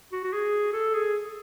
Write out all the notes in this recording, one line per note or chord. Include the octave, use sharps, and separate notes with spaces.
F#4
F#4
G#4
A4
G#4